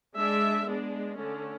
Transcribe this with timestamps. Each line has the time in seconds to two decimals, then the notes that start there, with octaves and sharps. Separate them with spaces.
0.17 G#3 D4 E5
0.67 G#3 B3 D4
1.17 D3 A3 C#4